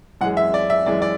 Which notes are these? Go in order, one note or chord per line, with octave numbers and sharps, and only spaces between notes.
F#2 E3 G#3 F#5
E5
D5
E5
F#2 E3 G#3 D5
D5